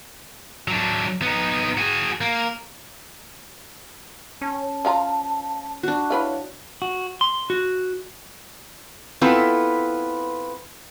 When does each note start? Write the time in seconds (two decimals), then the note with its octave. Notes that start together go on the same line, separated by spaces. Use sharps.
0.68 F#3 D4
1.22 B3 D#4
1.78 F#4 G#4
2.21 A#3
4.41 C#4 A5
4.85 F3 F5 A#5
5.83 D4 F#4
6.10 E4 B4 C#5 F5
6.82 F#4
7.21 C6
7.50 F#4
9.21 B3 C4 E4 F4 A4 B4